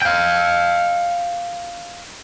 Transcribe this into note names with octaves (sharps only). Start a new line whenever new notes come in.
F5 G5